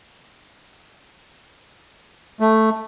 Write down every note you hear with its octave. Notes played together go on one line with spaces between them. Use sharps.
A3